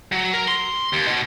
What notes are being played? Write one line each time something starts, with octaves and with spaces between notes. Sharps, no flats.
F#3
A#4
C6
D#2
B2